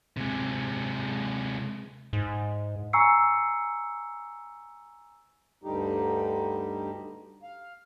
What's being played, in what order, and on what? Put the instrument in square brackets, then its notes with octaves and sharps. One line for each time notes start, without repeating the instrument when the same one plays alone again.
[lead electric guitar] C3 G#3
[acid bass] G#2
[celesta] G#5 A#5 C#6 E6 C7 C#7
[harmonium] D2 G2 D3 G3 D#4 G4
F5